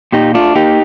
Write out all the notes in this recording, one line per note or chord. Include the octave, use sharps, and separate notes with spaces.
A#2 D#4 G4
A3 D4 F4
A#3 D#4 G4